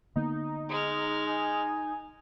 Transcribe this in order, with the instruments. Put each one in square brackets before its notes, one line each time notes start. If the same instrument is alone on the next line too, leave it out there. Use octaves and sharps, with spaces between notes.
[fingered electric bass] D3 A#3 B3 [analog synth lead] D#4
[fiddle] G#3 F6
[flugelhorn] G#5